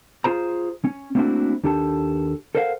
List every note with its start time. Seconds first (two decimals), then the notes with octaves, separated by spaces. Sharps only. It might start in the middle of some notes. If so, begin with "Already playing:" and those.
0.24 F4 G#4 C5 A#5
0.84 C#4
1.15 A3 A#3 C4 D4 E4 F#4
1.64 D#2 D4 G4 A4 A5
2.55 A4 A#4 C5 D#5 F5 F#5